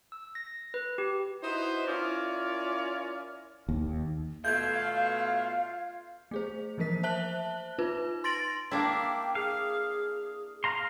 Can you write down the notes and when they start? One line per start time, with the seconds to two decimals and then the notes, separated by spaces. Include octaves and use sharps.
0.12 E6
0.35 A#6
0.74 B4
0.98 G4
1.44 D#4 E4 F#4 B4 C5 D#5
1.87 C#4 E4 F4 A#4 C#5 D5
3.69 D#2
4.45 B2 A3 F4 F5 G6 G#6
6.31 A3 G#4 C5
6.78 E3 F3 A#3 A#4 B6
7.03 C5 E5 A5 F#6 F#7 G7
7.79 D#4 F4 B4
8.24 C6 A6 A#6 D7 F#7
8.71 A#3 D4 E4 G5
9.35 G#4 F5
10.64 F5 A#5 C6